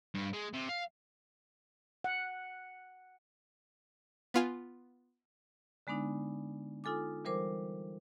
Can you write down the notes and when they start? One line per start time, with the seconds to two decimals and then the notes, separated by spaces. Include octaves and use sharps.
0.15 G2
0.33 G#3
0.53 C3
0.69 F5
2.04 F#5
4.34 B3 F4 G#5
5.87 D3 G#3 B3 D4 D#4
6.84 D#4 F4 A4 G#5 D6
7.25 E3 G3 A#4 C5 D6